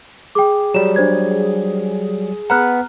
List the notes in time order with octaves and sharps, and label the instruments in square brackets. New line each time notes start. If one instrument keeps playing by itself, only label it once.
[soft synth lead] G#4 [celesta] G5 D6
[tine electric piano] F#3 G3 [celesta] E7
[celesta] D4 C5 G#6
[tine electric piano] B3 B4 F#5 [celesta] A#5 F6 F#6